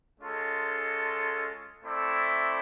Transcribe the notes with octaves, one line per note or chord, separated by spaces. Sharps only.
G#3 C#4 F4 A4
A3 C4 E4 A4 D5